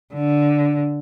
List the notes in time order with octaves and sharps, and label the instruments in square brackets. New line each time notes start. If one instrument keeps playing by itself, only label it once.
[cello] D3